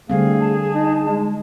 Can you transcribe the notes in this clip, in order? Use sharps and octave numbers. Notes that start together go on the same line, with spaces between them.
D3 G3 A3 C4 G#4 F5
A5
D#4
G#3